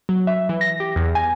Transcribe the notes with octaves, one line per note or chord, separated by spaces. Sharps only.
F#3
E5
E3
A#6
G4
E2
G#5